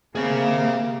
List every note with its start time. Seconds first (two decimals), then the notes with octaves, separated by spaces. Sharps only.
0.16 C3 A#3 G#4 F5